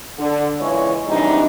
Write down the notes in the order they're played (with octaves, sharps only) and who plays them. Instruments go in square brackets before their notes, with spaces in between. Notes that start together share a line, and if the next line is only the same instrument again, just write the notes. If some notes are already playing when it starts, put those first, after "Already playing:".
[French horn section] D3
A#2 C#3 E3 G#3 C#5
F#2 C3 E3 G3 D4 D#4